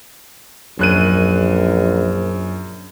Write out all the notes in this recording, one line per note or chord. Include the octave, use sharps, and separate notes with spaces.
A#1 F#2 F#6 D#7